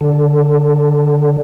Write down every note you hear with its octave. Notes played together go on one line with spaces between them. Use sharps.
D3